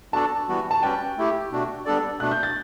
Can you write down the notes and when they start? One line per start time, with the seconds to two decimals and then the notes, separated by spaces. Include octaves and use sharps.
0.13 B3 D4 F#4 A4 D5 A5
0.48 E3 G3 B3 F#4
0.71 A5
0.82 G3 C#4 F#4 B4 D5 G5
1.17 A3 E4 G4
1.51 B2 A3 D4 F#4
1.85 G3 B3 D4 A4 D5
2.20 B2 A3 D4 F#6
2.32 G6
2.43 A6